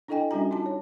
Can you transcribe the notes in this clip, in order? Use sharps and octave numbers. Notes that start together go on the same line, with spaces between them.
D4 E4 A4 D#5 G5 G#5
G3 C#4 D4 F#4 G#5 A#5
D#4 F4 A5
C#5